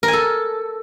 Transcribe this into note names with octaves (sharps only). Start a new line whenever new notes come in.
A#4
G#5
A4